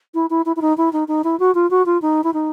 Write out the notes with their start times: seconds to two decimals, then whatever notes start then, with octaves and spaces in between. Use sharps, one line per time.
0.14 E4
0.30 E4
0.46 E4
0.56 E4
0.62 D#4
0.77 E4
0.93 D#4
1.08 D#4
1.24 E4
1.40 F#4
1.55 F4
1.71 F#4
1.86 F4
2.02 D#4
2.24 E4
2.34 D#4